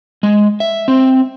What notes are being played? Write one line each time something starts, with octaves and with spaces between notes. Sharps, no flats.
G#3
E5
C4